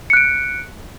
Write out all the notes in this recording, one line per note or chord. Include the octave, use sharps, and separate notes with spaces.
F#6 C#7 D7